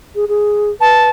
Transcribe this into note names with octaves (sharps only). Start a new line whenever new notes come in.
G#4
G#4
B4 A5